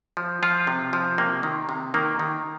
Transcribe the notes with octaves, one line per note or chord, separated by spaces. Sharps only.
F3
F3 F4
C3
F3
C3 A#3
D#3
C3
D#3 A#3
D#3